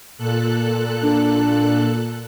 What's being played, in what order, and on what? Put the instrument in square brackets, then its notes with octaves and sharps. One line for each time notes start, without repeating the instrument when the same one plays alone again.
[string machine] A#2 A4 F#6
[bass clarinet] D4